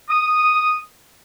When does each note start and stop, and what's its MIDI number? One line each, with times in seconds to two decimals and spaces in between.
0.08 0.78 87